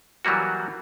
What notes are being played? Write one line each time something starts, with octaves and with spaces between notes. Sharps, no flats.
E3 F#3 G3 A#3 F#4